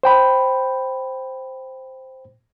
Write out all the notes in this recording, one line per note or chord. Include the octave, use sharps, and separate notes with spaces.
C5 G5 B5